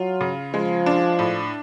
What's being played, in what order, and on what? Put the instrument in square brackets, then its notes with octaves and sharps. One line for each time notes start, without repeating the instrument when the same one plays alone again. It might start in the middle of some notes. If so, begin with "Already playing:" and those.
Already playing: [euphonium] F#3 [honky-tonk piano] F4
[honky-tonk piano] C#3
[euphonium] F3 [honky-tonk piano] G#3
[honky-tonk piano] D4
A2